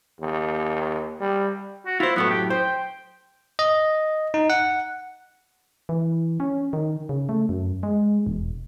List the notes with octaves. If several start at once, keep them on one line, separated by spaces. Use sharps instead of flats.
D#2
G3
F#4
E4 F4 C5
F#2 A2 A3 B3
G4
C5 G5
D#5
D#4
F#5
E3
C#4
D#3
C#3
A3
F#2
G#3
E1